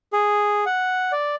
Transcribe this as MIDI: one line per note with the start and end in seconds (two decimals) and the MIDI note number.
0.13 0.65 68
0.66 1.12 78
1.12 1.35 74